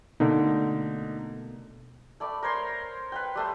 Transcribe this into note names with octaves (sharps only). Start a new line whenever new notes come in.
B2 D3 A3 A#3 D#4
A3 D5 B5 D6
A#4 C5 C#5 C6
B4 F5 G5
G3 A3 C5